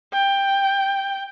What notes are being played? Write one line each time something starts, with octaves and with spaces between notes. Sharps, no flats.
G5